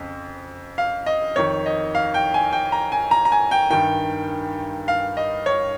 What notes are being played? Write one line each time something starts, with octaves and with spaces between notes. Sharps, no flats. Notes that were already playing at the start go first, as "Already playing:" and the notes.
Already playing: F2 C#3 F3
F5
D#5
F2 D#3 C#5
D#5
F5
G5
G#5
G5
A#5
G#5
A#5
A#5
G#5
G5
G2 D#3 G5
F5
D#5
C#5